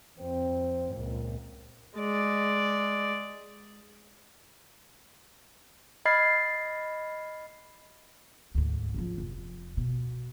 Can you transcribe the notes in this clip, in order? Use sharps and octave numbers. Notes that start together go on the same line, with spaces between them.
F2 C4
C#2 A#2
G#3 D5
D#5 B5 F6 G#6 A6 C7
D2 G#2
C#3 F3
F1
B2